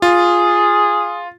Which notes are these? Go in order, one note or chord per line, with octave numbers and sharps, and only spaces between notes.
F4 G#4